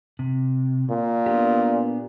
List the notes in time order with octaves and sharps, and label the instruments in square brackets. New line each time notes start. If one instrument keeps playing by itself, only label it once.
[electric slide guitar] C3
[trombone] A#2
[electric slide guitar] B3 D4 G4